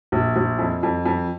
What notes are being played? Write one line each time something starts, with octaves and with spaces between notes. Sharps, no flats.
A#1
A#1
F2
F2
F2